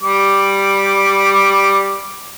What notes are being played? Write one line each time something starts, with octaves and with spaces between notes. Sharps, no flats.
G3 D6